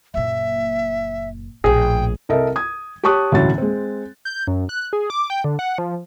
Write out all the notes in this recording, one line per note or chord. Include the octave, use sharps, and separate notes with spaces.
F#1 A#2 E5
A#1 A2 G#4 G5
C2 A4 A#4 D#5 E5
D#6 G#6
G4 C#5 A5 C#6 D#6 F#6
E1 D2 A2 F#3 C#4 A6
G#3 C4
G6
F#2
F#6
G#4
D6
G5
D3
F#5
F3